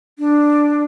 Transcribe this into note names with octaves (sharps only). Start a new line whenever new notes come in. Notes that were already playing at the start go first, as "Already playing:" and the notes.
D4